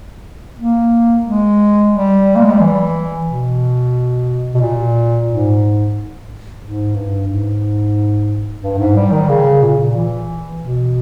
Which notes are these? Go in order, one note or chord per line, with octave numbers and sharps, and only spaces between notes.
A#3
G#3
G3
A#3
G#3
G3
E3
B2
B2
A#2
G#2
G#2
G2
G#2
G2
G#2
G3
D#3
C#3
A#2
E3
B2